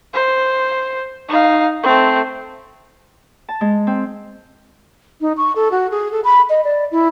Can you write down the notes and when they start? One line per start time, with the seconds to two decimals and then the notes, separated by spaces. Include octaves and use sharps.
0.14 C5
1.29 D#4 F5
1.84 A3 C4
3.49 A5
3.61 G#3
3.87 C4
5.21 D#4
5.37 C#6
5.56 A4
5.71 F#4
5.91 G#4
6.12 A4
6.24 B5
6.50 D#5
6.64 D5
6.91 E4